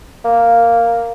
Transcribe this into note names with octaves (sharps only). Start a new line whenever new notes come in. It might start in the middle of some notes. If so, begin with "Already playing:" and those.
A#3